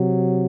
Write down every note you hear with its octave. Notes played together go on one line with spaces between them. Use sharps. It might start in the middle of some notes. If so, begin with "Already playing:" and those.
Already playing: C3 F#3